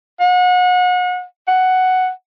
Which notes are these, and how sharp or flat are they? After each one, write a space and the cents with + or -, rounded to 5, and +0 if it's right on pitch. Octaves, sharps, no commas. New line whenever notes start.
F#5 -35
F#5 +5